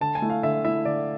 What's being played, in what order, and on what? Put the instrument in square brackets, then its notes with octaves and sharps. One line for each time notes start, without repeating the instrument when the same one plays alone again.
[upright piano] D3 A5
G#5
A3 E4
F5
D3 E5
A3 E4 E5
D3 D5